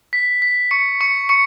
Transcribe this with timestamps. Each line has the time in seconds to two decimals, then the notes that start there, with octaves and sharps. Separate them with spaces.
0.13 B6
0.42 B6
0.71 C#6 C#7
1.01 C#6 C#7
1.29 C#6 C#7